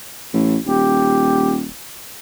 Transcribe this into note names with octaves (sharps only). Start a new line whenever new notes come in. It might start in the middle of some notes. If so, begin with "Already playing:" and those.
A1
D#1 G4